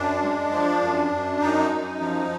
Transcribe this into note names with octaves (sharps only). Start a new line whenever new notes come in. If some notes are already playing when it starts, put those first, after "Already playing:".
Already playing: F#2 D4
G#3
F3
F#2
F#2
F#2 D#4
F#2
F3